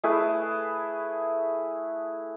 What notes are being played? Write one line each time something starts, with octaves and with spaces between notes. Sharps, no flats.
A3 E4 G#4 B4